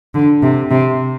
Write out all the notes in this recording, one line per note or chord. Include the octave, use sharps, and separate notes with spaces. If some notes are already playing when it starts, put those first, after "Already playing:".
D3
C3
C3